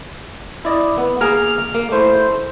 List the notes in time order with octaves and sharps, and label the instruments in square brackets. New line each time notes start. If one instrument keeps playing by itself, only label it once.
[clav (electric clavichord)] E4 D5 D#5
B3
[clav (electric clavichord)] A#3 G#4 A#4 [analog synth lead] F6
[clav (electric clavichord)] A#3
[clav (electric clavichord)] A3 E4 [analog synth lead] C5